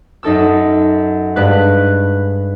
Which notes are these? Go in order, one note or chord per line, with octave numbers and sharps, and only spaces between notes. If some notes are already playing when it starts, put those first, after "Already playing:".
F#2 D#4 A4 E6
G2 G#3 B4 F#6